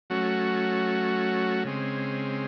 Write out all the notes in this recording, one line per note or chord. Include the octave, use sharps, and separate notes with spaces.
F#3 A3 C#4 F#4
C#3 G#3 C4